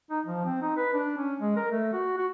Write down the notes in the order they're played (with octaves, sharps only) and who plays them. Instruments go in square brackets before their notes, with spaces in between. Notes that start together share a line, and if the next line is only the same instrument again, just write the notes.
[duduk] D#4
F3
C4
D#4
B4
D4
C#4
G#3
A#4
A3
F#4
F#4